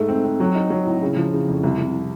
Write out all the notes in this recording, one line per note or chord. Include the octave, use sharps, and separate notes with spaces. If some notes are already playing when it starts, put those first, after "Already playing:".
Already playing: G#2 A3
C4
C4
F#3
D#4
F#3
A2
C#3
F3
C#3
F2
C2
C2